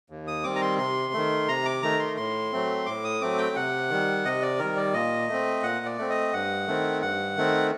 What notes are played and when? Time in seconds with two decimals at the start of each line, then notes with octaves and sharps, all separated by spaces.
0.10 D#2
0.27 D#6
0.44 D#3 G3 C4 D6
0.55 A#5
0.61 C6
0.78 C3 C6
1.13 D#3 A3
1.48 C3 A#5
1.65 D6
1.82 D#3 A3 A#5
2.00 C6
2.17 A2 C6
2.52 F#3 A3 C4
2.86 A2 D6
3.04 D#6
3.21 F#3 A3 C4 D6
3.38 G5
3.56 C3 F#5
3.90 D#3 G3
4.25 C3 D#5
4.42 D5
4.59 D#3 G3 A#4
4.77 D5
4.94 A#2 D#5
5.29 A3 C4
5.63 A#2 F#5
5.86 D5
5.98 A3 C4
6.10 D#5
6.33 G2 F#5
6.67 D#3 A3 C4
7.02 G2 F#5
7.37 D#3 A3 C4